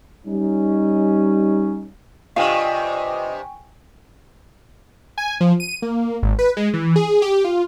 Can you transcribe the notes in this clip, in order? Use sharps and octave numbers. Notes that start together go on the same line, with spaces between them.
G3 C#4 D#4
G2 C3 F4 D#5 F5 G5 G#5 C#6
G#5
F3
D#7
A#3
G#1
B4
G#3
E3
G#4
G4
F4